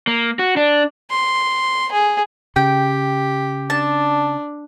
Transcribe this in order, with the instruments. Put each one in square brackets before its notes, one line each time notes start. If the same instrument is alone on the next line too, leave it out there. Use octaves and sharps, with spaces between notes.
[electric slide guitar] A#3
F#4
D4
[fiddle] C6
G#4
[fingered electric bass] C#3 [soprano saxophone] G4 [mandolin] G5
[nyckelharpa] D4 [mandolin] A5